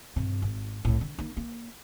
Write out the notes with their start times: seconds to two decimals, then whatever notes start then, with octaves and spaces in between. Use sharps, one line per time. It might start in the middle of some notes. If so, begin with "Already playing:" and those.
0.16 G2 C3
0.42 G#1
0.85 C2 A2
1.01 D3
1.19 A#3 D#4
1.37 A#3